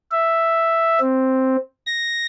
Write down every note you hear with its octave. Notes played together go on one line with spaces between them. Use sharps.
E5
C4
A#6